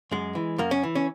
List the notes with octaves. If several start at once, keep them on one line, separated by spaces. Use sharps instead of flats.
F#2 G#3
E3
F#2 A#3
C#4
E3
C#4